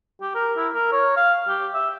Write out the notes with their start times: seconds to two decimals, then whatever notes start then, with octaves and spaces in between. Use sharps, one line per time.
0.21 G4
0.35 A#4
0.57 E4
0.74 A#4
0.92 C#5
1.16 F5
1.48 G4
1.74 E5